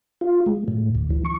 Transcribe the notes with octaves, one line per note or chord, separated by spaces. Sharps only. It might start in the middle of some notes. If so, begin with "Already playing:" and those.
F4
G#3
A2
D2
E3
C#6